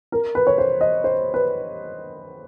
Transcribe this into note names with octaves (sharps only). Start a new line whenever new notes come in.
A#4
B4
C#5
C5
D#5
C5
B4